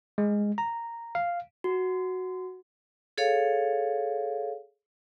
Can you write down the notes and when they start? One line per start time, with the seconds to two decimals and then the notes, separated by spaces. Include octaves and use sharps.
0.18 G#3
0.58 A#5
1.15 F5
1.64 F#4
3.18 G#4 A4 C#5 F5